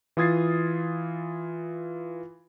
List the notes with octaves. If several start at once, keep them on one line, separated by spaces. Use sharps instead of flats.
E3 F4 D#6 G#6 A6 C7